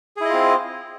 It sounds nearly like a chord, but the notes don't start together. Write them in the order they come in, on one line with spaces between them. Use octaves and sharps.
G#4 E4 D#5 F4 C4